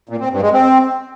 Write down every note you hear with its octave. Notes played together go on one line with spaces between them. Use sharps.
A#2
C4
G2
G#3
C4